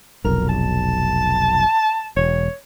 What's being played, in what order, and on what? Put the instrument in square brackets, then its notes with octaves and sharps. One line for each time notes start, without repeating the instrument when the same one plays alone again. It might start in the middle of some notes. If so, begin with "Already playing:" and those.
[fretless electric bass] F1 B1 [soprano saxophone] A#4
[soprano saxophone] A5
[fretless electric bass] E1 [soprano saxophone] C#5